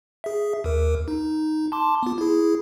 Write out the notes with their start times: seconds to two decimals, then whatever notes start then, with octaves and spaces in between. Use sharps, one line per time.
0.24 G#4 E5
0.64 D#2 A#4
1.08 D#4
1.72 A5 C6 D6
2.03 B3 F4
2.18 E4 G#4